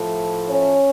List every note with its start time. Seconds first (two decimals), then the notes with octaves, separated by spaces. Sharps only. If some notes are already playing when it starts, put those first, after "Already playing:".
Already playing: A2 F3 A3
0.48 C#4 C#5